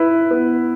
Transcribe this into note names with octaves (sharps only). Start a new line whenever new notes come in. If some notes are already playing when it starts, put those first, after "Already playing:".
Already playing: E4 B4
B3